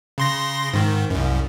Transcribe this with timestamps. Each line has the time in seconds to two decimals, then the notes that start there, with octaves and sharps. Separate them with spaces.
0.18 C#3 C6 A#6
0.74 G#2 D#3
1.10 C2 F#2